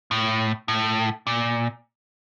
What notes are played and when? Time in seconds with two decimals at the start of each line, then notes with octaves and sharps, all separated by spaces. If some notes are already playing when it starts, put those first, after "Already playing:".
0.11 A2
0.68 A2
1.27 A#2